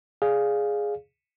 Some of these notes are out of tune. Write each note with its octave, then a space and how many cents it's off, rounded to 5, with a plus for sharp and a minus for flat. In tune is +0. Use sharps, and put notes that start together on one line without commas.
G#4 +0 D5 +0 F5 +0